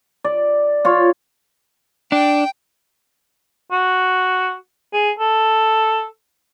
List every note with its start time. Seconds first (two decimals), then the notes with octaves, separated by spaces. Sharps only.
0.24 D5
0.85 F4 C#5
2.12 D4 G5
3.71 F#4
4.93 G#4
5.19 A4